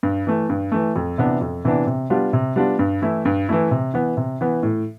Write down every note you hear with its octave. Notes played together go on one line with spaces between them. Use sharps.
G2
E3 A3
G2
E3 A3
F2
C3 E3 B3 D4
F2
C3 E3 B3 D4
C3
G3 B3 D4 F4
C3
G3 B3 D4 F4
G2
E3 A3 E4
G2
E3 A3 E4
C3
E3 B3
C3
E3 B3
A2